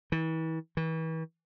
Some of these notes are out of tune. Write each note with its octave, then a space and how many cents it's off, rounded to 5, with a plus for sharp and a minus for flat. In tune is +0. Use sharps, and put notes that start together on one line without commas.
E3 -35
E3 -35